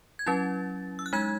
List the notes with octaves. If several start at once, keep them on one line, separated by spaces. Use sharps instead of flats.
G#6
F#3 C#4 E4 A6
E6
F#6
G#3 D#4 G#6